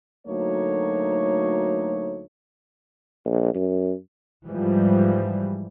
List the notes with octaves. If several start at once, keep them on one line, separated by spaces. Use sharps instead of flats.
D2 F#3 A3 A#3 D#4 C#5
A#1
F#2
G#2 E3 F3 G3